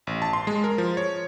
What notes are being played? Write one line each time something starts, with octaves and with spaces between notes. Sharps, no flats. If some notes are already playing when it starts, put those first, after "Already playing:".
A1
A5
C6
G#3
A#4
F3
C#5